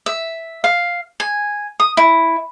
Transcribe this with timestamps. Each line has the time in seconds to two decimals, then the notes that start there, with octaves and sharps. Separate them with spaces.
0.06 E5
0.64 F5
1.20 G#5
1.80 D#6
1.97 E4